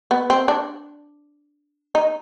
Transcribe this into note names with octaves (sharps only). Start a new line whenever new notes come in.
B3
C4
D4
D#4